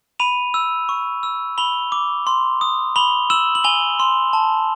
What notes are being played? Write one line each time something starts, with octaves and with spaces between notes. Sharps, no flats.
B5 D#7 F7
E6
C#6
E6
B5 F7 G7
D6
C6
D#6
B5 F7 G7
E6 E7 F#7
F#7
G#5 F7 G7
C6
A5